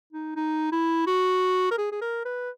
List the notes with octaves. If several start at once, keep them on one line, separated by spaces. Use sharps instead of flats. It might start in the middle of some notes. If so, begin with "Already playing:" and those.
D#4
D#4
E4
F#4
A#4
G#4
G#4
A#4
B4